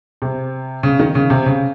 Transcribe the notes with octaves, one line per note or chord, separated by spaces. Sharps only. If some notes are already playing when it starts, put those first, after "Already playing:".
C3
C#3
D#3
C#3
C3
C#3